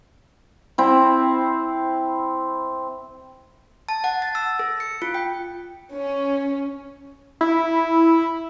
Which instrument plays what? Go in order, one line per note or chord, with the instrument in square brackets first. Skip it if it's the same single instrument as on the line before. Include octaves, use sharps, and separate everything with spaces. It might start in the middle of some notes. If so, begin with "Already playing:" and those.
[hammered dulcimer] C4 E4
[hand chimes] A5
F#5
A6
E6
A4
C#7
F4
G5
[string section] C#4
[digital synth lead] E4